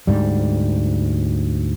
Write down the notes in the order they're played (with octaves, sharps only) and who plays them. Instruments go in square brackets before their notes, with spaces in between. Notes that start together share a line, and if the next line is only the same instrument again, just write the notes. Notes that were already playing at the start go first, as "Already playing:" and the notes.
[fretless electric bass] D2 G#2 G3